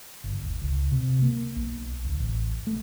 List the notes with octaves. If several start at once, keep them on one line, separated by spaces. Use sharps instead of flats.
G1
D#1
C#2
C3
A#3
B1
D1
A1
A3